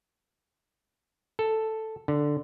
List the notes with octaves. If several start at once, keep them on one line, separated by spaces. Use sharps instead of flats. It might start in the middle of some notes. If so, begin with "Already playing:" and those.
A4
D3